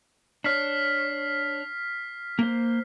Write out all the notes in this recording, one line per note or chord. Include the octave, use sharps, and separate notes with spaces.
D4 C#5 F6 B6 C7
A#3 C5